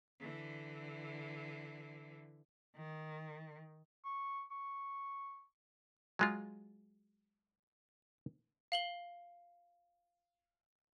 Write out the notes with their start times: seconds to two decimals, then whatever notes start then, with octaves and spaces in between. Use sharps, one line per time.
0.20 D3 E3
2.77 D#3
4.05 C#6
4.51 C#6
6.19 F#3 G#3 F4
8.72 F5 F#7 G7